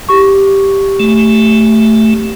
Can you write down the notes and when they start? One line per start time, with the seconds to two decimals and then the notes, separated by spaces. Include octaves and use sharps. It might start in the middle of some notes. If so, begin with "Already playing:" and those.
0.09 G4 C#6
1.00 A3